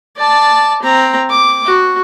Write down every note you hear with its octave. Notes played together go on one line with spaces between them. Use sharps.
D5 A5
C4 A#5
D6
F#4